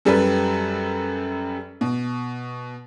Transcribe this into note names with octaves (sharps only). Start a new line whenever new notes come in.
F#2 G3 A4 B4
B2